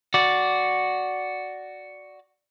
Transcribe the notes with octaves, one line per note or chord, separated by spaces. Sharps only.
F#4 D5